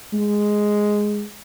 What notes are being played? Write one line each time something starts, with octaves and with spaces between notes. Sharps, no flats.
G#3